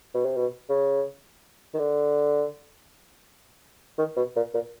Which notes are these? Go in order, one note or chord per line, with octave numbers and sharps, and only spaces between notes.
B2
C3
B2
C#3
D#3
D3
D#3
B2
A#2
A#2